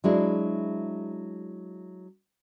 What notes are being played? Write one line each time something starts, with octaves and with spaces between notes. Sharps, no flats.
F#3 G#3 D4 E4